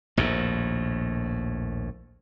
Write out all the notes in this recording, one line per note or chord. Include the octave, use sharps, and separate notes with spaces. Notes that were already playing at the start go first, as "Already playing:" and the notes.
A#1 D#2 A2